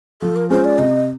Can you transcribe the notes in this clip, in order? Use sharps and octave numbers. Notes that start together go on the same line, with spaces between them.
F3 A4
A#4
G#3 C#4 F4 C5
D5
C3 D#5